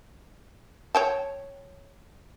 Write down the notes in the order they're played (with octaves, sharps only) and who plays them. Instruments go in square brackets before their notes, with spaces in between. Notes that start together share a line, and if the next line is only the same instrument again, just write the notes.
[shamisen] C#5 G5 A5